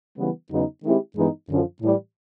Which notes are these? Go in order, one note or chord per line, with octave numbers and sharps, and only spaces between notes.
C#3 E3 G3 B3
E2 C#3 F#3 B3 D#4
D#3 G#3 C4 E4 G4
G2 E3 G#3 B3 D#4
F#2 D3 F3
A2 E3 G3